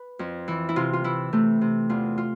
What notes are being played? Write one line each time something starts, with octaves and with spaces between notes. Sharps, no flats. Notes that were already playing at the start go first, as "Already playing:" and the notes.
Already playing: B4
F2
E3
E4
C3 F4
F4
E3 E4
C3 A3
C3
E2 F4
F4